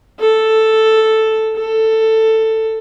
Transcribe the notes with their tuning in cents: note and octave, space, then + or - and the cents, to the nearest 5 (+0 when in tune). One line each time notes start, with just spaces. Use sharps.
A4 +0
A4 +10